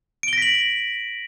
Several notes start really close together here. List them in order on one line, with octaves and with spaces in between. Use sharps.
D7 G7 A#6 B6 F#7